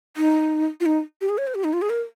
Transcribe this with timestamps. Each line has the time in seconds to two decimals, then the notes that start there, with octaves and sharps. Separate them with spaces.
0.17 D#4
0.80 F4
0.86 D#4
1.21 G4
1.29 G#4
1.38 C#5
1.47 C5
1.55 G4
1.64 D#4
1.73 F4
1.82 G#4
1.90 A#4